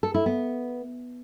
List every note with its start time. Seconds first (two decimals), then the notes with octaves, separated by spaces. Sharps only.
0.03 A4
0.14 E4
0.26 B3